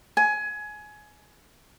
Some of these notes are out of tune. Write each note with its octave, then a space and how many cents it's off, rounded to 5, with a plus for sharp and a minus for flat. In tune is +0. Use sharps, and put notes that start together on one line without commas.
G#5 +20